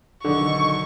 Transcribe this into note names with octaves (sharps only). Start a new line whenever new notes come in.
B1 D3 D#3 C#6